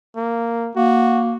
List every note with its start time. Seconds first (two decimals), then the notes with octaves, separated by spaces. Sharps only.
0.16 A#3
0.76 A#3 F#4